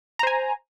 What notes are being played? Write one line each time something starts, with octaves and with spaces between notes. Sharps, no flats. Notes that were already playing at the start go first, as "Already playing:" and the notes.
C5 G#5 A#5